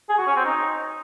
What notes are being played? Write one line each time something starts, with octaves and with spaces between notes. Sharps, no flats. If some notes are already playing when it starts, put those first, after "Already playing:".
G#4
F#4
C#4
C4
D#4